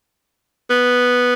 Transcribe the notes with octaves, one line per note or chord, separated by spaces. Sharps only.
B3